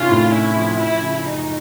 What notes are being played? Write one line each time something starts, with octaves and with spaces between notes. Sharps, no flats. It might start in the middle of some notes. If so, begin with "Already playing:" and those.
Already playing: C3 D#3 C#4 F4
A2
C#4 E4
F3
F3 E4
C#3
F#2 D#4